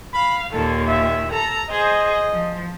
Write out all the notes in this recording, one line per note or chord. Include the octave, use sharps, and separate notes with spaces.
F5 B5
D#2 A#2 D#3 A4
E5
A4 A#5
G#4 C5 D#5
F3